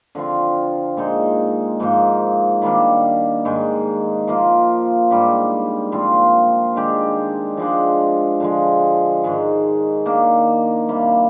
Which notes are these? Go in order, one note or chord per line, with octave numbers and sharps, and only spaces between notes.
D3 F3 C4 F4
A#2 G#3 D#4
G#2 F3 A#3 D#4
D#3 G3 A#3 D4
G#2 D#3 G#3
F3 A#3 F4
G#2 G3 D4 G4
A#2 F3 C4 F4
D#3 G#3 D4 G4
F3 G#3 D4
D3 F3 G#3
G#2 D#3 G#3
D#3 A#3 D4
C3 G3 A#3